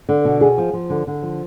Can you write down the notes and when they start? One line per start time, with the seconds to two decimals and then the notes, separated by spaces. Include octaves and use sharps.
0.09 D3
0.25 B2
0.41 G#4
0.58 F3
0.73 F3
0.90 D3
1.07 D3
1.23 F3